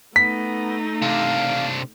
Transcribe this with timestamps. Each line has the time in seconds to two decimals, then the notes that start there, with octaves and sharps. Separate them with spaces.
0.16 A3 B3 D#4 B6
1.02 C3 D4 F5